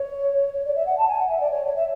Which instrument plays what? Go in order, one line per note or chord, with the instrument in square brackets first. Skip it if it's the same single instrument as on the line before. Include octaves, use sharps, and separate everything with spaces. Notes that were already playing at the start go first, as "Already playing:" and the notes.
Already playing: [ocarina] C#5
C#5
D5
E5
F#5
A5
G#5
F#5
E5
D5
C#5
C#5
E5